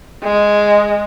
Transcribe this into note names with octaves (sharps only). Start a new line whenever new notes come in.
G#3